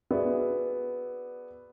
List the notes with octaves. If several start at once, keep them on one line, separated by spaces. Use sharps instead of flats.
B3 F#4 G#4 D5 E5